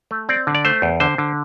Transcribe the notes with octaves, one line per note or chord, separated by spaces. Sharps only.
A3
C4 D5
D3
D5
A3 C5
E2
D3 C5
D3